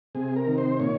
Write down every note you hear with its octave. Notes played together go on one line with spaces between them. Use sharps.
C3 G#4
A#4
D#3
C5
A#2 C#5